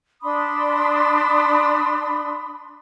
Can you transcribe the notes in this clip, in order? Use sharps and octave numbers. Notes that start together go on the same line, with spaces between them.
D4 B5 C6 D#6